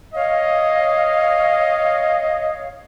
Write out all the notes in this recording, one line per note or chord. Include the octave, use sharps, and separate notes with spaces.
C#5 D#5 F5